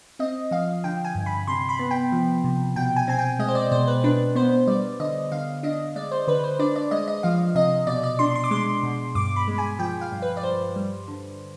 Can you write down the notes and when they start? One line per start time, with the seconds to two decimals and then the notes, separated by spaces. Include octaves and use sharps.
0.19 C4 D#5
0.51 F3 F5
0.84 D3 G5
1.04 G#5
1.15 G2
1.26 B5
1.47 C3 C6
1.69 B5
1.79 B3
1.91 G5
2.12 F3
2.44 C3
2.76 B2 G5
2.96 G#5
3.08 C4 G#5
3.19 G5
3.39 G#3 D#5
3.48 C5
3.55 D5
3.71 B2 C5
3.87 B4
4.04 D4 B4
4.35 B3 C5
4.67 G3 D5
5.00 D3 D#5
5.32 D3 F5
5.63 D4 D#5
5.96 G#3 D5
6.12 C5
6.27 D3 B4
6.44 C5
6.59 D4 D5
6.76 D5
6.91 G#3 D#5
7.08 D#5
7.23 F3 F5
7.55 C3 D#5
7.87 B2 D5
8.04 D5
8.19 D4 C6
8.36 C6
8.44 D6
8.51 G#3 C6
8.83 B2
9.15 G2 D6
9.36 B5
9.48 G#3
9.58 G#5
9.79 F3 G5
10.01 F5
10.12 G2
10.22 B4
10.37 D5
10.43 G2 C5
10.76 G3
11.08 D3